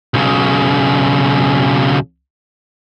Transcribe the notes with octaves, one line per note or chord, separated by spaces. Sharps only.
B1 C#3